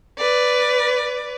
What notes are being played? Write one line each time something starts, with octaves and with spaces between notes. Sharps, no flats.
B4 D5